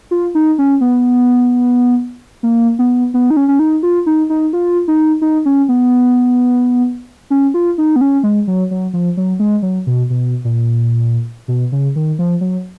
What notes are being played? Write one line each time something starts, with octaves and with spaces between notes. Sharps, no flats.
F4
D#4
C#4
B3
A#3
B3
B3
D#4
C#4
C#4
D#4
F4
D#4
D#4
F4
D#4
D#4
C#4
B3
C#4
F4
D#4
B3
C#4
G#3
F#3
F#3
F3
F#3
G#3
F#3
B2
B2
A#2
B2
C#3
D#3
F3
F#3